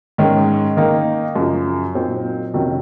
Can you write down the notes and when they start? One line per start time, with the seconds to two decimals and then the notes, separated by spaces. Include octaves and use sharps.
0.18 G#2 D#3 G#3 C#4
0.77 D#3 A#3 D#4
1.36 F#2 C#3 F3
1.95 A#2 F#3 C4 D#4
2.54 F2 C3 D#3 F#3 C#4